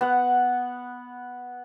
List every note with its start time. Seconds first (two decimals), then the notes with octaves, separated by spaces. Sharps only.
0.01 B3 F#5